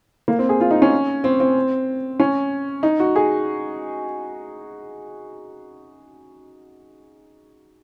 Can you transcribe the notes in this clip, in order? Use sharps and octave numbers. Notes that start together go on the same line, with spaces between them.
A#3
C4
G#4
F4
D#4
C#4
C4
C4
C#4
D#4
F#4
G#4